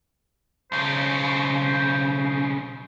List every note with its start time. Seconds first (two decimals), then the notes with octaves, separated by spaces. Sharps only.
0.72 B1 C#3 C5